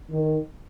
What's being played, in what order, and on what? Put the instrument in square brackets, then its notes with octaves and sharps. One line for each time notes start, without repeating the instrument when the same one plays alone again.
[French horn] D#3